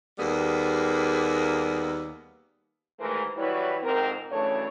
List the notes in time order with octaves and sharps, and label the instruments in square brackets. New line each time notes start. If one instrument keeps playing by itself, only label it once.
[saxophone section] D#2 G3 A#3 B3 G#4
[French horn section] D#2 E3 G#3 A3 A#4 C5
E3 F#3 G3 E4 B4 C#5
F2 G#2 C3 C4 A#4
F#2 C#3 E3 A3 D4 C#5